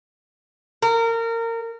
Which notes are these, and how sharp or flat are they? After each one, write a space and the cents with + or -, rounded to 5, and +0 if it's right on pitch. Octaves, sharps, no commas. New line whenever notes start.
A#4 -25